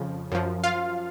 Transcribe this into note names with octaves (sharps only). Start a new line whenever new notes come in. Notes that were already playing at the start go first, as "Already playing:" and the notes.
Already playing: F2 C#3 F3
F#2 F3
F4 F5